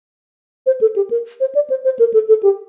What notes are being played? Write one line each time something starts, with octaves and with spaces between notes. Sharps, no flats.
C5
A4
G4
A#4
C5
D5
C5
C5
A#4
A4
A4
G4